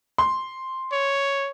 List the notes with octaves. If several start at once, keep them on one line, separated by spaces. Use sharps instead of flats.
C6
C#5